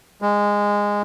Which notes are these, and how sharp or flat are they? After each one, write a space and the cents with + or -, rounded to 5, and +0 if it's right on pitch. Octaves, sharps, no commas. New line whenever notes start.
G#3 -15